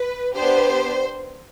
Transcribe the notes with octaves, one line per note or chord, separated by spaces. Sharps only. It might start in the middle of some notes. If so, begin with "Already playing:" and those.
Already playing: B4
B3 D4 G4 C5